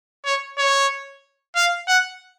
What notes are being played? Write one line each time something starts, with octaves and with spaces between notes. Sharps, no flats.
C#5
C#5
F5
F#5